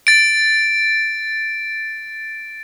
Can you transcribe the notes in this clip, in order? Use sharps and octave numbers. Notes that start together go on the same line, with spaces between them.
A6 D7